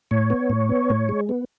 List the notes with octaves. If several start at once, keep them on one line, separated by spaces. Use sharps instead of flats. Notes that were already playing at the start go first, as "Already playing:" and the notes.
A2 C#5
B3
A2
B3
A2
G#3
B3